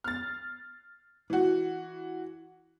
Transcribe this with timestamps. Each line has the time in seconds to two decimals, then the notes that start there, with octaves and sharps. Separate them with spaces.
0.04 F6 A6
1.30 E3 F#4